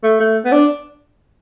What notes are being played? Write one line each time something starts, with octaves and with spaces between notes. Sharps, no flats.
A3
A3
B3
D4